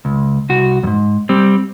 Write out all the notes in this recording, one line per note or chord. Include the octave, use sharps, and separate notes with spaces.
C#2
C2 F#4
F2 G#2
G3 C4